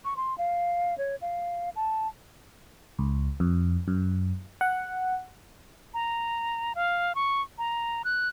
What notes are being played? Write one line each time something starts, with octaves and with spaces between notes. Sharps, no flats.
C#6
C6
F5
C#5
F5
A5
C#2
F2
F#2
F#5
A#5
F5
C#6
A#5
F#6